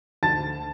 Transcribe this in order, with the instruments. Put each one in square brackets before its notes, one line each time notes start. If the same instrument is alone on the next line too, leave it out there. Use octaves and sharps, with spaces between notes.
[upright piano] D2 A5 A6